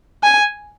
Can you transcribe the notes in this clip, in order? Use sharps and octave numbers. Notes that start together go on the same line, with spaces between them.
G#5